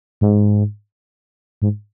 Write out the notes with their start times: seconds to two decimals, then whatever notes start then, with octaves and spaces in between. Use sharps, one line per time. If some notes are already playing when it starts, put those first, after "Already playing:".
0.21 G#2
1.62 G#2